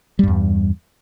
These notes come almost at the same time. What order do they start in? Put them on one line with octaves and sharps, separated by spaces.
G3 G2 E2